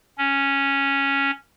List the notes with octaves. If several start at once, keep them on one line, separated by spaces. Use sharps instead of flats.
C#4